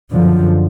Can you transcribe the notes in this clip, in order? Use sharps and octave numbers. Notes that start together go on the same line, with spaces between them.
F#2 D3 F3